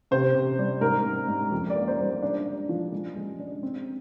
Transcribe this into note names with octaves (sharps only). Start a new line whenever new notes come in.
C3 C5
C3
G3
G#2 A#4
G#2
G#2
F2
D5
A#3
C5
G3
D4
D4
F3
G#3
G#3
D4
C4